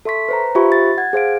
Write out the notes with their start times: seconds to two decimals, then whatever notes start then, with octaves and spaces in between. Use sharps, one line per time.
0.05 A4 E5 C6 C#6 B6
0.29 B4 C5 A#5
0.55 F4 G4 C5 E5 B5 C#6
0.72 A6
0.98 F#5 G#6
1.13 G#4 C5 F5 D7